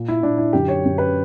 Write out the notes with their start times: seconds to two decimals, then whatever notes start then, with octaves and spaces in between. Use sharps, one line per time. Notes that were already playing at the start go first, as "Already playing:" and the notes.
Already playing: A#2
0.08 E4
0.23 A#2 D4
0.38 E4
0.53 F#2 D3 G4
0.68 C#5
0.83 F#2 D3
0.98 B4